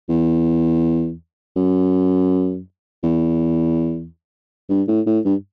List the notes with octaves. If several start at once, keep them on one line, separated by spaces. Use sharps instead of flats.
E2
F#2
E2
G2
A2
A2
G2